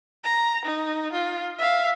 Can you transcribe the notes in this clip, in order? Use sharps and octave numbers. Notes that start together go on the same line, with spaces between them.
A#5
D#4
F4
E5 F5